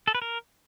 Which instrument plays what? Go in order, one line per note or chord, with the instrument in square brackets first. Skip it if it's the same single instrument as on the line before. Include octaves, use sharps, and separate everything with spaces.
[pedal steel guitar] A4
B4
A#4